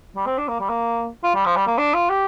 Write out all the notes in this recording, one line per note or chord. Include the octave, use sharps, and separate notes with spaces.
G3
C4
D4
A#3
G3
A#3
F4
G3
F3
G3
A#3
D4
F4
G4